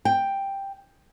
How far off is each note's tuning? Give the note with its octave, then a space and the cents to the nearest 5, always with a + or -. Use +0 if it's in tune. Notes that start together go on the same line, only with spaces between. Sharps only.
G5 +5